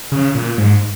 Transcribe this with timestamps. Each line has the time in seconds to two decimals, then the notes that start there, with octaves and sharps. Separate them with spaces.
0.12 C#3
0.34 A#2
0.58 G#2